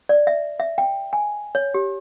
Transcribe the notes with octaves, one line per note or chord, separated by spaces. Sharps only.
D5
E5
E5
G5
G#5
C#5
G4